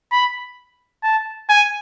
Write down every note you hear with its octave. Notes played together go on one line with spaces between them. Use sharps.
B5
A5
G#5